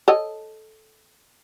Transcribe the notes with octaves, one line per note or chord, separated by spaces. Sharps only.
A4 C#5 D#5